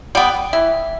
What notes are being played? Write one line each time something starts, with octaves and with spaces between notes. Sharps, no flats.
G3 B3 G5
E3 E5